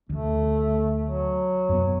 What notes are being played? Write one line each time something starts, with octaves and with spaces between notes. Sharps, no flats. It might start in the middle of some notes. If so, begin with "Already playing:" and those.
D2 A3
F#3
F#2 B3